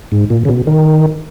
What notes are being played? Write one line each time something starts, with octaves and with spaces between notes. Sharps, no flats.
G#2
A#2
C#3
B2
D#3